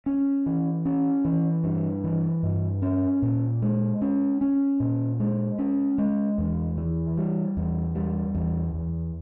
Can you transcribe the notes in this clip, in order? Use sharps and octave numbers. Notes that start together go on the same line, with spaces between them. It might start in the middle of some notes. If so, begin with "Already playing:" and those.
C#4
E3
C#4
E3
G2
E3
G2
C#4
A#2
G#3
C#4
C#4
A#2
G#3
C#4
G#3
E2
E3
G3
E2
G3
E2
E2